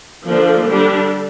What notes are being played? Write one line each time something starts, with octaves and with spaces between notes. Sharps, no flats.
D3 F3 A#3 D4 A4
D3 G3 D4